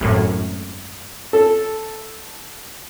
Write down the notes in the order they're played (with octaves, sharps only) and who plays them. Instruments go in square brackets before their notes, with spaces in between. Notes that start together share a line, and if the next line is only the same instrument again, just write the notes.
[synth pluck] G#1 F#2 A2
[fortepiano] A4